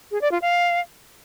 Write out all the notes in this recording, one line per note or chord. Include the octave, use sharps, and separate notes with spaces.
G#4
D5
F4
F5